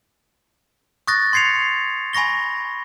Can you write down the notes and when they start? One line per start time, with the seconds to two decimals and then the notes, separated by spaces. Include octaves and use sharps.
1.07 C#6 D#6 F#6 A6 A#6
1.33 C6 G#6 C7 C#7 F7
2.13 G#5 B5 C#6 A#6 G7